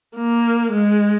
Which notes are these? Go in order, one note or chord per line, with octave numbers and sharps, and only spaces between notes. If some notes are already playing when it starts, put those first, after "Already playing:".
A#3
G#3